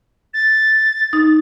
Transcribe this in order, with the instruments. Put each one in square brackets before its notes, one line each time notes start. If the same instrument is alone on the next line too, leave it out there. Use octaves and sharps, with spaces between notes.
[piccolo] A6
[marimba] D#4